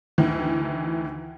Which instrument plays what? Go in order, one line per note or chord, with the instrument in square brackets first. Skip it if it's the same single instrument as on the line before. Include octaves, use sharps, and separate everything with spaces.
[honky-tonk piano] D2 D#3 E3